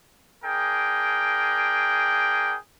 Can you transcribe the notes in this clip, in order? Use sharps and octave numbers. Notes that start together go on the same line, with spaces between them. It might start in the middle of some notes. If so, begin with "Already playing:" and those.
D4 G#4 A#4 G5